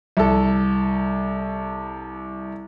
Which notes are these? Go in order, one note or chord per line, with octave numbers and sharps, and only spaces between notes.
C2 A4